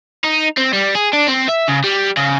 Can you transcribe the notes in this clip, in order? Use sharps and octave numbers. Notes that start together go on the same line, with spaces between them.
D#4
C4
G3
G#4
D4
C4
E5
C#3
G3
C#3